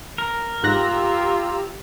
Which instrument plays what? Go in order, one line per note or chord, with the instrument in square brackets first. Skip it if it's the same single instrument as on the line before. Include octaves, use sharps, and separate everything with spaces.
[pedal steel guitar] A#4
[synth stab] G#2 F#6 A#6 [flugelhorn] F4 [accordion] G4 A#5 E6